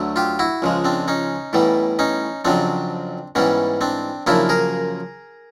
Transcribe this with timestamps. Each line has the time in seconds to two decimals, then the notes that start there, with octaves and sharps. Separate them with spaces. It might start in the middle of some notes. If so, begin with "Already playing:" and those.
Already playing: D2 D3 F#3 A3
0.16 F4 G4
0.39 E4 F#4
0.62 C#2 C#3 F3 G#3
0.85 C4 D4
1.08 C#4 D#4
1.53 A2 E3 G3 B3
1.99 C#4 D#4
2.45 F2 C#3 F#3 C4 D4
3.35 G#2 E3 G3 B3 C#4
3.81 C4 D4
4.27 F#2 C#3 F3 A#3 D4 E4
4.49 G#4 A#4